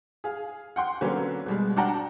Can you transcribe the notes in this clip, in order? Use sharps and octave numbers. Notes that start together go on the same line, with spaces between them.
G#4 F5
F#5 G5 C6
D3 F#3 A#3 C4 C#4 B4
B2 G3 G#3
D4 F#4 F#5 G5 A5 A#5